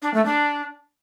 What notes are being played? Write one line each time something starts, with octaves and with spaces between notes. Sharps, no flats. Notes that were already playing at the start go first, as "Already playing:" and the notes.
D4
A3
D4